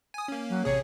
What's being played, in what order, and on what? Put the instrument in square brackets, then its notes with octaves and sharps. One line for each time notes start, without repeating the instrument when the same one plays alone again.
[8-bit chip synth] G#5 D#6
A#3 C#4
[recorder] F#3
[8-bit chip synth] A1 C3 G#4 [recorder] C#5